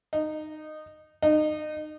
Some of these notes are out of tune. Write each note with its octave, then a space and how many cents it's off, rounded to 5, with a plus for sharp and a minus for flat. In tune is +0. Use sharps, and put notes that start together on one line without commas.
D#4 -15
D#4 -25